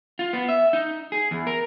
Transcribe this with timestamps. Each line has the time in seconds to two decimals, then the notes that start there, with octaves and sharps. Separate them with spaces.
0.19 F4
0.33 B3
0.49 E5
0.73 D#4
1.12 G#4
1.31 E2
1.47 A#4